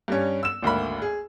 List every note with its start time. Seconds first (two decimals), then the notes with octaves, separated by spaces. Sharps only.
0.08 G2 G3 C#4
0.43 E6 E7
0.62 G#1 D2 A#3 B5
1.02 G#4